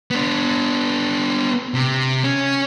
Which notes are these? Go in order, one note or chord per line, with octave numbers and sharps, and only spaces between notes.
B3 D4
C3
C#4